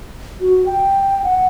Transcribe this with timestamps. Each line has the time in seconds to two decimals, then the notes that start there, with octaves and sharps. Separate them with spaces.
0.40 F#4
0.66 G5
1.24 F#5